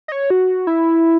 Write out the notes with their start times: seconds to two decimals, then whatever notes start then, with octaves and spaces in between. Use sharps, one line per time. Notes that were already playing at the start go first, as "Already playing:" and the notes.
0.08 D#5
0.12 C#5
0.30 F#4
0.67 E4